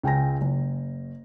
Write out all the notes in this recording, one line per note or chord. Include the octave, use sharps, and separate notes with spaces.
C#2 G5 G#5 A#6
F#1